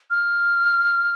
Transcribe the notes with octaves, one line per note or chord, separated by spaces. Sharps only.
F6